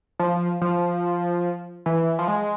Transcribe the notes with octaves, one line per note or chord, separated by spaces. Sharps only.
F3
F3
E3
F3
G#3